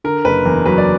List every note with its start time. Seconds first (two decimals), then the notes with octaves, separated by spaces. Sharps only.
0.04 D3 A#4
0.25 F#1 B4
0.45 E2 A#4
0.65 F#3 B4
0.78 D5